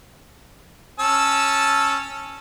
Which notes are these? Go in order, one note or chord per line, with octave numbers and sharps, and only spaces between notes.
C#4 A5 E6